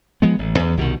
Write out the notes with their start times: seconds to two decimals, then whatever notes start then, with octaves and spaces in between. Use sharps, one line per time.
0.22 F3 G#3 B3
0.39 A1
0.59 E2
0.77 C2 B2 D3 D#3